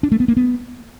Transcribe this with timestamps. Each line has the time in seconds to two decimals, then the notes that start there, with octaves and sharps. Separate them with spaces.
0.03 D4
0.12 A3
0.20 B3
0.28 A#3
0.37 B3